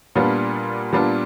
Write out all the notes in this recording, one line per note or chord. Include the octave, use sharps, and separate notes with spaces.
A#2 G3 B3 D4 F4
A#2 G3 B3 D4 F4